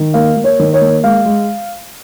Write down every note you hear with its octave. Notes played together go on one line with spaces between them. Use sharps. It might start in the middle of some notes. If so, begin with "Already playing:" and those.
Already playing: D#3
A#3 F5
A#3
C#5
D#3
C#5
A#3
G#3 F5
G#3